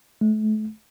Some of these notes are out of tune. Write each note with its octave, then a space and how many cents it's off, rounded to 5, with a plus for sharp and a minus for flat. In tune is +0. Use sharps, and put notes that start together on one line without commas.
A3 -35